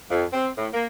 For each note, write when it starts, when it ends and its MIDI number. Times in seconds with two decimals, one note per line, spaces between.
0.11 0.25 41
0.33 0.48 60
0.58 0.68 45
0.74 0.85 58